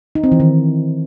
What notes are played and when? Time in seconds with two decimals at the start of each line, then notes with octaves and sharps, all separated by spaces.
0.15 D#4
0.24 C4
0.32 E3
0.40 D#3